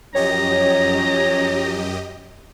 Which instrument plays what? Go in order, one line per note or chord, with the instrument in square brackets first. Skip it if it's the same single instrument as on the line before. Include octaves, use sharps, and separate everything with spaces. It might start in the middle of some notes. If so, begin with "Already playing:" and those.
[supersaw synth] F#2 G4 D#5 [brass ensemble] F3 F#3 C#4 [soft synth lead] C#5 [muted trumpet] A#5